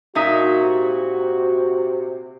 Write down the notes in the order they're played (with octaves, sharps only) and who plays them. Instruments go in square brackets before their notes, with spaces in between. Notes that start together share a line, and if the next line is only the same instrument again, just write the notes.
[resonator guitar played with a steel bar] A#2 D#4 E5 [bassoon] A#3 [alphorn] F#4
[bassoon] C3